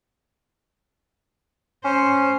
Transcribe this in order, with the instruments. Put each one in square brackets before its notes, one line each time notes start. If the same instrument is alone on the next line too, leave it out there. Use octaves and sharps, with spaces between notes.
[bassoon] C#4 [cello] C5